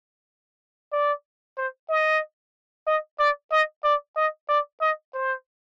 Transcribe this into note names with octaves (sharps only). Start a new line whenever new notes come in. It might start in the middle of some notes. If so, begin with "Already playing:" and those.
D5
C5
D#5
D#5
D5
D#5
D5
D#5
D5
D#5
C5